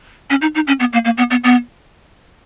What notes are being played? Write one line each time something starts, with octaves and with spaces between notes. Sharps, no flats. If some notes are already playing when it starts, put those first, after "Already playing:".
C#4
D#4
D#4
C#4
B3
A#3
A#3
B3
B3
B3